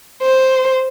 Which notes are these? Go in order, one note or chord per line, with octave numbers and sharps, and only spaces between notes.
C5